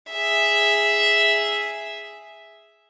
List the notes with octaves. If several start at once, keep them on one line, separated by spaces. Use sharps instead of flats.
G#4 E5